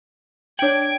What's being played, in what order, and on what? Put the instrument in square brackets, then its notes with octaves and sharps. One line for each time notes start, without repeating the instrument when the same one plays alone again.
[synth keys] D4 G5 [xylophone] C#5 F#7 [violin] G#6 D7